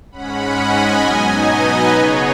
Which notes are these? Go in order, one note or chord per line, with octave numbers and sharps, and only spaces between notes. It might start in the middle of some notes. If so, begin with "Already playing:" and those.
G#2 G#3 C#4 F#5 B5
D#5 G#5
B2 F#3 B3 D#4
B4 D#5
C#3 B3 D#4 G#4 C#5